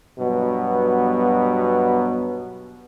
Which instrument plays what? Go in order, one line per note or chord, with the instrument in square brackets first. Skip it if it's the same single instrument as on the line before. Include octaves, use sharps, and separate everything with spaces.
[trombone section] G2 B2 F#3 B3